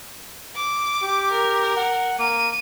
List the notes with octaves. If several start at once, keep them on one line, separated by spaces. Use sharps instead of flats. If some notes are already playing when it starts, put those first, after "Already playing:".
D6
G4
A#4
F#5
A#3 D#7